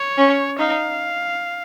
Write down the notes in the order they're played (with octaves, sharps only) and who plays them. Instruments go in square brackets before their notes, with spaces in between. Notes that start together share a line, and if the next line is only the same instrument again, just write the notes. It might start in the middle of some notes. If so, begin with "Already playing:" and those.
Already playing: [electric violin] C#5
[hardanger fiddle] C#4
[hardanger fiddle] D#4 [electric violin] F5